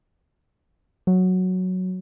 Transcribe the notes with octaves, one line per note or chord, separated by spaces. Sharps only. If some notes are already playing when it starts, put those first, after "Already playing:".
F#3